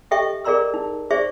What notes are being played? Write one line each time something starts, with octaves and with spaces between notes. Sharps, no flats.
G4 A4 D#5 E5 G5 C#6
G#4 A#4 D5 A#5 C6 E6
D#4
G#4 C5 D5 E5 C#6